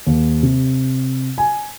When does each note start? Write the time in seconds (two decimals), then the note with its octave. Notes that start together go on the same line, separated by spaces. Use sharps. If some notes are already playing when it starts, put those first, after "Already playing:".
0.06 D#2
0.43 C3
1.38 G#5